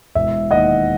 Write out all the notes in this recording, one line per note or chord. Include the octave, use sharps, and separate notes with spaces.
E1 E5
D#2 D#3 D#5 F#5